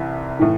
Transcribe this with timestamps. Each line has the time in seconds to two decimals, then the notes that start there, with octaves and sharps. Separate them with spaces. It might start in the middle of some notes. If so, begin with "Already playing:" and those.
Already playing: C2 C3 E3
0.39 A2 E3